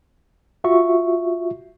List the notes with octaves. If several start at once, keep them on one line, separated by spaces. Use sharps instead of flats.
F4 F#4 E5 C#6